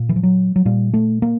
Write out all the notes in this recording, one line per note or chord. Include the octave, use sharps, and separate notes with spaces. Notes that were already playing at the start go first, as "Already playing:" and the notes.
Already playing: A#2
E3
F3
F#3
F#3
A#2 G3
A3
A#3